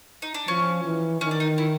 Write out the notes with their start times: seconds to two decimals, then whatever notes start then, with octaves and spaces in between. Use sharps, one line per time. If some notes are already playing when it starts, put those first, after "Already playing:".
0.22 D#4
0.34 D4
0.47 F3 C#4
0.84 E3
1.21 D#3 C#4
1.31 D4
1.40 D#4
1.58 E4